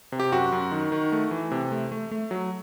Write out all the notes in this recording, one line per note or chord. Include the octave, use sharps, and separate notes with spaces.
C3
G4
F#2 F#4
F#2
D#3
D#3
A3
E3
C3
A3
A3
A3
F#3